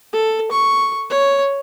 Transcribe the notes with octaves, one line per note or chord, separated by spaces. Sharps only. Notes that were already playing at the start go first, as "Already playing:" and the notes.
A4
C#6
C#5